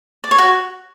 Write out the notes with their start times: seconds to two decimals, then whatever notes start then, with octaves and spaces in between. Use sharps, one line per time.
0.24 D5
0.31 C#5
0.38 F#4